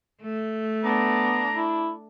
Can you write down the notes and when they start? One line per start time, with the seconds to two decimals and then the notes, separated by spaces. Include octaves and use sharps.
0.22 A3
0.84 B3 D4 A#5
1.53 E4